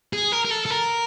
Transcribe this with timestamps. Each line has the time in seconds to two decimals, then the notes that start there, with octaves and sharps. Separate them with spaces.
0.13 G#4
0.32 A#4
0.45 A#4
0.51 A4
0.66 A4
0.70 A#4